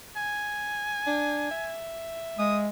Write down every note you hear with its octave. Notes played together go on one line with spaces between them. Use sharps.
G#5
D4
E5
G#3 D#6